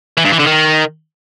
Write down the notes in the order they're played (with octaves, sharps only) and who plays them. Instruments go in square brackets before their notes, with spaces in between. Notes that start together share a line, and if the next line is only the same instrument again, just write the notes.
[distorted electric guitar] E3
G2
E3
D3
D#3